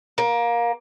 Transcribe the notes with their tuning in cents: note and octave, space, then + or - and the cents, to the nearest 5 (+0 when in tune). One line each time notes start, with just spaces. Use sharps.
A#3 +20